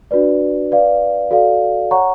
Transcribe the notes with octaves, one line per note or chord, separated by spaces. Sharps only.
D4 F#4 B4 D5
B4 D5 F5
F#4 A4 D5 F5
C#5 F#5 A#5 C#6